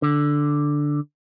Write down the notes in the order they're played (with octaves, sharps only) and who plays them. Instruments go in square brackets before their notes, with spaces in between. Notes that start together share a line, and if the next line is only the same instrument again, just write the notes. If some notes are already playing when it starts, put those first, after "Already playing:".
[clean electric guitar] D3